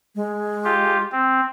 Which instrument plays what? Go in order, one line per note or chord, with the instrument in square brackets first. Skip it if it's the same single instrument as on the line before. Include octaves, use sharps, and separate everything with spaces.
[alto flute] G#3
[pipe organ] F4 G4
C4